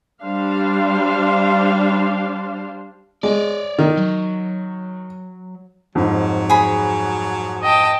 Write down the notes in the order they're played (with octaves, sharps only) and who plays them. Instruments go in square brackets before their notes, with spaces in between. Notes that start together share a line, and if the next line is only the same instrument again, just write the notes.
[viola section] G3 D4 C5 F5
[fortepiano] G#3 [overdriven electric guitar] C#5 D5
[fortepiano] D#3
[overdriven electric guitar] F#3
[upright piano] F2 G#2 [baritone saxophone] F#3
[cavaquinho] G#4 B5
[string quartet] D#5 G5 A5